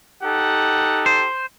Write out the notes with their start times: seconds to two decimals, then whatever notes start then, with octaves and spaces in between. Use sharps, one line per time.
0.23 D#4 G4 A4 F#5
1.06 C5